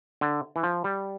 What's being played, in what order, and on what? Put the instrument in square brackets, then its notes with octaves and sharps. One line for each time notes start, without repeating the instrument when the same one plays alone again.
[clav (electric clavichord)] D3
E3
F3
G3